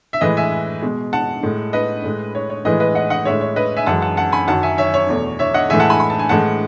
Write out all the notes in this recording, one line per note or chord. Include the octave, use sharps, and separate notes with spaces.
E5
A2 E3 G#3 B4 D#5
E5 G#5
B2 G#3
F#5 A5
A2 G#3
B4 D#5
A2 G#3
C#5
C#5
A2 E3 G#3 B4 D#5
B4 D#5
D#5 F#5
D#5 F#5
A2 G#3 C#5 E5
C#5
B4 D#5
E5 G#5
F#2 E3 G#3 F#5 A5
F#5 A5
F#5 A5
G#5 B5
F#2 D#3 F#3 F#5 A5
E5 G#5
C#5 E5
C#5
E2 B2 A3
C#5 E5
D#5 F#5
A2 E3 G#3 E5 G#5
F#5 A5
G#5 B5
B5
A5
G#5
A2 E3 G#3 F#5 A5